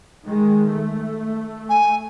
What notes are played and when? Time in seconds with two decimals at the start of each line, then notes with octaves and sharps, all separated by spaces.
0.24 D#3 G#3
0.71 A3
1.69 G#5